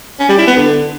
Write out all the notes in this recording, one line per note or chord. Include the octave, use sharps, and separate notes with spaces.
C#4
G3
E4
B3
D3